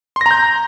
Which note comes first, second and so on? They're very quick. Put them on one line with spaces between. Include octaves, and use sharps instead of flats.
C6 A#6 A#5 G6